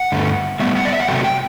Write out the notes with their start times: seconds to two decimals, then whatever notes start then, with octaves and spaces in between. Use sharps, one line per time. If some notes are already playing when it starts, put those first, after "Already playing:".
Already playing: F#5
0.12 G2 D3 A3
0.60 A2 G3 B3 E5
0.76 F#5
0.85 D5
0.93 E5
1.00 F#5
1.07 C3 F#3 A3 G5
1.24 G5